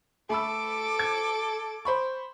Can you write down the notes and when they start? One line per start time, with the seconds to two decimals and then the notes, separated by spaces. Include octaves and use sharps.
0.30 A3 A4 B5 D6 E6
0.99 G#6
1.85 C5 B5 C#6